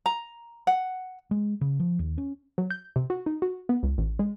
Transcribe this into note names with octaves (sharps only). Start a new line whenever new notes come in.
A#5
F#5
G#3
C#3
F3
D#2
C#4
F#3
G6
C3
F#4
D#4
F#4
B3
C#2
A1
G#3